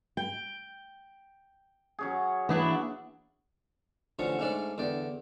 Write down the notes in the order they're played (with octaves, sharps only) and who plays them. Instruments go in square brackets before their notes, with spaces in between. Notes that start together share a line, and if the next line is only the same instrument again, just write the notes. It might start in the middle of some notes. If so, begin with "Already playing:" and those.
[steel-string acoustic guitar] G5
[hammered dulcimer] F#3 C#4 G#4
[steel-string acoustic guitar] E3 D4 E4 [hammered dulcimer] A#3 B3
[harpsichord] A1 D3 F3 F#3 C#4 C#6
G#2 A3 C#4 D4 D5 B5
E2 D3 D5 G5